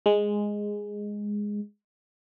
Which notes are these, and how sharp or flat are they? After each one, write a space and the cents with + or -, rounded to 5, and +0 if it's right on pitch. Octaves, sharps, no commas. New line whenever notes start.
G#3 -5